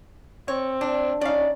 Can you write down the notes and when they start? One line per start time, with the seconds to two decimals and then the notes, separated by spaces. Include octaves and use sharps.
0.48 C4 C#5
0.81 D4
1.21 C#4 D#4 D5 F5